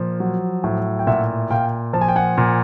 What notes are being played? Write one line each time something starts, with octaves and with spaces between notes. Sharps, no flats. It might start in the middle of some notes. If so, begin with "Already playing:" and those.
Already playing: A#2 F3
F#3
A2
G5
A#2 E5 F#5
A#2 F5 G5
F3 A5
G#5
G5
F#5 G#5
A#2